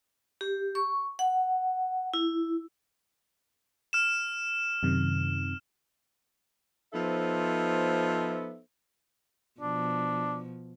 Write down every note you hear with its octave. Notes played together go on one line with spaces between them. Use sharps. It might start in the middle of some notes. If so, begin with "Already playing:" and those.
G4
C#6
F#5
E4
F6 E7
F#2 C3 D#3
F3 B3 D#4 A4 C5 E5
B2 F3 D4